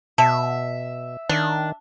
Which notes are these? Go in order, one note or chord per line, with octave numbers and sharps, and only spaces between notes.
B2 E5 A5
D#3 D4